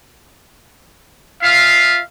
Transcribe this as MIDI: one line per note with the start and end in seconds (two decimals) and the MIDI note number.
1.42 2.00 65
1.42 2.00 76
1.42 2.00 77